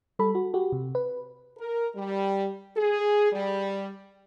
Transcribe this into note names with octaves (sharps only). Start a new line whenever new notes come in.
G3 A4 B5
F#4
F#4 G4
C3
B4
A#4
G3
G#4
G3